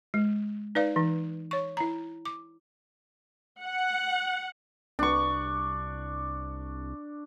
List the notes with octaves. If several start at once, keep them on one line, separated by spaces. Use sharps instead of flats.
G#3
D#4 B4 D5 F5
E3 D#4
C#5 C#6
E4 A#5
D6
F#5
C2 D4 C#6